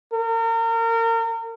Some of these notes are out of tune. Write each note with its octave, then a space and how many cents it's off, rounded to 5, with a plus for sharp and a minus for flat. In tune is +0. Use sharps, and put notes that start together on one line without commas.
A#4 -35